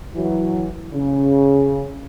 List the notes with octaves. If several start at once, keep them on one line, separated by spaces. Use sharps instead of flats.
E3 F#3
C#3